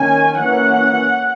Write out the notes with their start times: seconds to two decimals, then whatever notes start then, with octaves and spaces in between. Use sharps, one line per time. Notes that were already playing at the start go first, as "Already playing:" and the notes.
Already playing: D#3 A#3 C#4 G#5
0.39 E3 A#3 C#4 F#5